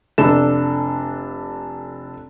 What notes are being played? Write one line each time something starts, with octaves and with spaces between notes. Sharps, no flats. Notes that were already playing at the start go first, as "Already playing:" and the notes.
F1 D4 A4 E7